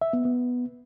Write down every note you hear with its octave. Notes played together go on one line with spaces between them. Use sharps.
E5
B3
B3